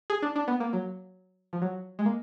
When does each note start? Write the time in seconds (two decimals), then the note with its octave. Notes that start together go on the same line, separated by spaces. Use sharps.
0.10 G#4
0.23 D4
0.36 D4
0.48 B3
0.60 A#3
0.73 F#3
1.53 F3
1.62 F#3
1.99 G#3
2.06 A#3